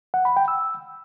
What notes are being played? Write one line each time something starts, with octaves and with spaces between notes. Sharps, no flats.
F#5
B5
G5
E6